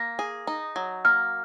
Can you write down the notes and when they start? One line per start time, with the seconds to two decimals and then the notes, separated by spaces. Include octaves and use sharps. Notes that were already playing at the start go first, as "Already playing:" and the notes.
Already playing: A#3 A#6
0.19 G#4
0.47 D#4
0.76 F#3
1.05 A#3 F6